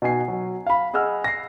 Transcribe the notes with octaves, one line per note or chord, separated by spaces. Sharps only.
B2 D#4 G#5 C7
F#3
F5 B5
G#4 D#5 F#5 E6 F6
A#6 C7